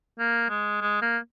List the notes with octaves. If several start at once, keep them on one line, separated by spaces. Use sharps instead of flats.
A#3
G#3
G#3
A#3